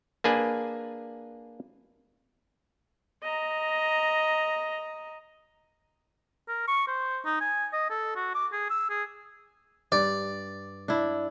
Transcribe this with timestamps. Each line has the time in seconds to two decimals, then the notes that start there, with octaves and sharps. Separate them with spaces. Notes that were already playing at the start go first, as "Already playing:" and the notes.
0.24 A#3 D4 G#4 B4 G#5
3.23 D#5 A#5
6.48 A#4
6.68 C#6
6.88 C5
7.25 D#4
7.41 G#5
7.73 D#5
7.90 A4
8.16 F#4
8.35 D6
8.53 G#4
8.70 E6
8.90 G#4
9.92 G2 D5
10.88 D4 E4